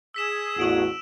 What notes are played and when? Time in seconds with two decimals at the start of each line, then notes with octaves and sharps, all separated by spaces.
0.14 G#4 D#6 E6 B6 E7
0.58 A1 E2 F#4 B6 D7 F#7